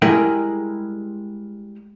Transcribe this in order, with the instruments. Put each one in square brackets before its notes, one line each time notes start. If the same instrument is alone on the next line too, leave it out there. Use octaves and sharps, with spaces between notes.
[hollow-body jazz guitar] G3 G#3 E4 A#4 D#5 G5